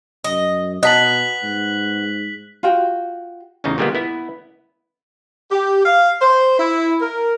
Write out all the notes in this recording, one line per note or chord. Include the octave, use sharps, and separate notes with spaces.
F#2 D#5
B2 B3 D#5 A5 F#6 B6 F#7
G#2
F4 F#4 G5
A1 E2 C#3 D#4
A#2 D3 G3 G#3 A#3 B3
B3 E4
G4
F5
C5
E4
A#4